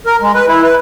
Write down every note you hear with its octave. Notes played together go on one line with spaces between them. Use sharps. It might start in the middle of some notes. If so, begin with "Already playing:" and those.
A#4
G#3
B4
E4
B4